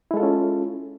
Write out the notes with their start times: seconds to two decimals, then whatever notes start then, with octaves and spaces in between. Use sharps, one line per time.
0.11 E4
0.14 G#3
0.17 A4
0.20 F4
0.23 C#4